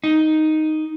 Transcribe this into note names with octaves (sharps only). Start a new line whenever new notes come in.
D#4